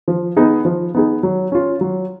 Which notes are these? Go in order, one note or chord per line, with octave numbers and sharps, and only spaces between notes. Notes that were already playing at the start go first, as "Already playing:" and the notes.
F3
B3 D#4 G#4
F3
B3 D#4 G#4
F#3
C#4 F4
F#3